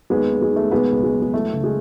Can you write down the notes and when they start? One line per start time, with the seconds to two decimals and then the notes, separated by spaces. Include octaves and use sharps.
0.10 D#2 G#3 B3
0.31 D#2
0.42 G#3
0.51 D#3 A3
0.71 B2 G#3 B3
0.93 C#2
1.03 G#3
1.13 F#3
1.22 G#3
1.34 E3 A3
1.53 C#3
1.64 G#3